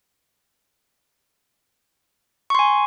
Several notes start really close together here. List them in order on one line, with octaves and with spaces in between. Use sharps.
C#6 C6 G#5